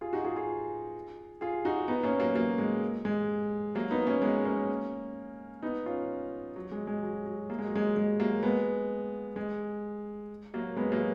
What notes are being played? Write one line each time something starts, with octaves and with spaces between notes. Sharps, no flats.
F4 G#4
D#4 F#4
F4 G#4
F4 G#4
F4 G#4
D#4 F#4
B3 D#4
A#3 C#4
F#3 A#3
F#3 A#3
G#3
G#3
F#3 A#3
B3 D#4
A#3 C#4
G#3 B3
A#3 C#4
B3 D#4
C#4 F4
F#3
G#3
G#3
F#3
F#3
A#3
G#3
F#3
G#3
G#3
F#3 A#3
G#3 B3
G#3
F#3 A#3
G#3 B3
F#3 A#3